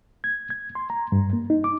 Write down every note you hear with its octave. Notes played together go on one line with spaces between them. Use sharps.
G#6
G#6
C6
A#5
G2
A#3
D#4
D6